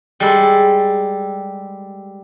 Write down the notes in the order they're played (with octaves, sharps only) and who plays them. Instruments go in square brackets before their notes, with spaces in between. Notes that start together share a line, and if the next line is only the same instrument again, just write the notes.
[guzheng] G3 G#3 A4